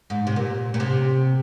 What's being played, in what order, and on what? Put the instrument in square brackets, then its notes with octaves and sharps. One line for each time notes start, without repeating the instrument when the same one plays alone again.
[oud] G#2
C3
A#2
A#2
C3